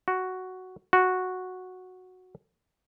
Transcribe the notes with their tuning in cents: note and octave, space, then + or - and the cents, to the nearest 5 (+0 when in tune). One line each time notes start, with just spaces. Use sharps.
F#4 +5
F#4 -5